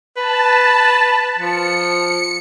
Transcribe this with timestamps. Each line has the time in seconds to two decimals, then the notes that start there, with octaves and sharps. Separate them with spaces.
0.17 B4 A5
1.38 F3 C#7